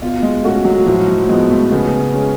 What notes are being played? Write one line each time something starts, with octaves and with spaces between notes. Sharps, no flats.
B2 F4
G#3
A3 C#4 F#4
F#3
A2 F3
F#3
F3 G#3 B3
A3
C#3 B3
G#3 C#4